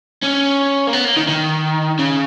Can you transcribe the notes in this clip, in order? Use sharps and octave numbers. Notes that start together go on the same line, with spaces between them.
C#4
A#3
B3
A#3
D#3
D#3
C#3